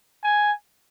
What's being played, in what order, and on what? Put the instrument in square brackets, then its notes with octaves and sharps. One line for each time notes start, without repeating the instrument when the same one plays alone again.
[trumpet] G#5